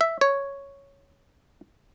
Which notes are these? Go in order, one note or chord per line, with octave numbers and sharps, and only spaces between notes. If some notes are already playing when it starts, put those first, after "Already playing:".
E5
C#5